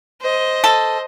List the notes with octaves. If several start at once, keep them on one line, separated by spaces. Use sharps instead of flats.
C5 D#5
A4